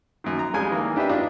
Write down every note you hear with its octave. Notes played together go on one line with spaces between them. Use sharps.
F#2 D#3
A#5
F2 G3 G#3 G#5 D#6
D#3 E3 A#3
D4 G4 B4 D#5 E5
D4 D#4 F4